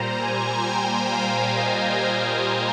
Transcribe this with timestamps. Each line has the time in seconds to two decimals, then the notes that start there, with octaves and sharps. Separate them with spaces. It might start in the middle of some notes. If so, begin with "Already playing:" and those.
Already playing: A#2 G3 C5 A#5
0.21 G#5
0.67 G5
1.11 F5
1.56 D#5
2.01 D#5